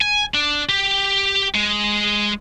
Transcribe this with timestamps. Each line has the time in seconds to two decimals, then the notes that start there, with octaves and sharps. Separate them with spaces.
0.02 G#5
0.35 D4
0.69 G4
1.54 G#3